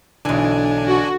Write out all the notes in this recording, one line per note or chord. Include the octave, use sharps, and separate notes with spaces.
B1 D3 E3 D4 D#4 G#5
F#4